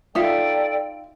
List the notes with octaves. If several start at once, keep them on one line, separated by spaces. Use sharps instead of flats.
D#4 F4 A4 D5 E5 G5